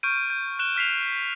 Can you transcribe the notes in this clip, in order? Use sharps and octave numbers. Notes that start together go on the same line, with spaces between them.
C#6 F6 G6 D7 D#7
G6
F#6 E7 G7
F6 B6 C7 F7